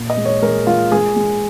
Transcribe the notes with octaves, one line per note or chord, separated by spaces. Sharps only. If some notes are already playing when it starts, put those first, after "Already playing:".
Already playing: A#2
D#5
G#3
C#5
G#3 A#4
G#3 F4
G#3 G#4
G#3